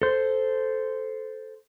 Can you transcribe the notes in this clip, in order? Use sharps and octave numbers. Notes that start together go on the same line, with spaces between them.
A4 C5